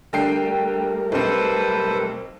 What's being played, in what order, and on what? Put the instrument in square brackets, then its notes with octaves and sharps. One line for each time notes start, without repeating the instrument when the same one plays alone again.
[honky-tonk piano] D3 G5 C7 [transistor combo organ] G3 A3 A#4
[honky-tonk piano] B1 C4 [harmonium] A4 B4 C5